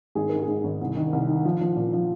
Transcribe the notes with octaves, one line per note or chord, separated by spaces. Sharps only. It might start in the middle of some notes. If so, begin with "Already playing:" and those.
G#1 G#4
G#2 A#4
G#4
G#2
G#1
C2
D#3
C2
D#3
F3
F3
A#2
F3